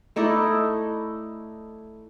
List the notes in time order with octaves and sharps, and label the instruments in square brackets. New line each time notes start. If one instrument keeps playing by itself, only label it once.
[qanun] A3 D#4 E4 D5